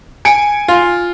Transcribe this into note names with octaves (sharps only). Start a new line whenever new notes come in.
G#5 C#7 D7
F4